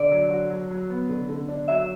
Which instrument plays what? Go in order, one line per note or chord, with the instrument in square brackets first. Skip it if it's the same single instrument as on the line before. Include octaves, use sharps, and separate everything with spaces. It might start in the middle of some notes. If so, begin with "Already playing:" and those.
Already playing: [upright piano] D3 [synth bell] D5
[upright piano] F#3
F#4
F#3
F#3
B3
D3
D3
D4
[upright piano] F#3 [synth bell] E5